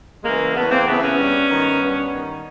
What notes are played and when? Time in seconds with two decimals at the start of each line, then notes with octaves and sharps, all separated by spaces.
0.24 C#3 E3 G#3 A#3
0.54 E2 A3 B3
0.70 A#3 C4
0.85 C#3 E3 A3 B3
1.01 B3 C#4
1.17 G2
1.49 D#3
1.79 G2
2.11 D#3